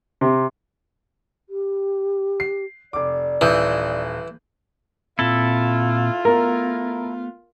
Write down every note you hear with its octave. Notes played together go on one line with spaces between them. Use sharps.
C3
G4
C7
F1 D5 D6
D#1 E3 D#6 G6
A#2 C4 E4 F4 A4
A3 B3 A#4